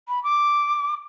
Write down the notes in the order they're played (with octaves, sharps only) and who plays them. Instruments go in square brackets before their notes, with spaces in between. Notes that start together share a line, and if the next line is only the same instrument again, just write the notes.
[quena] B5
D6